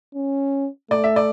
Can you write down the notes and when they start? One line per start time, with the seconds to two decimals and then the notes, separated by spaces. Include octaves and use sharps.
0.15 C#4
0.91 A3 D5
1.04 E5
1.16 D5